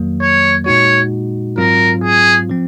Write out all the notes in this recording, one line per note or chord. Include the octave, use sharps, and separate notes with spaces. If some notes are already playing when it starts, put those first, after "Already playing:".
Already playing: F2 D#3 F#3 A#3
C#5
A#2 G#3 D#4 F#4 C#5
G#2 F#3 C4 F4 A#4
G#4
F3 C4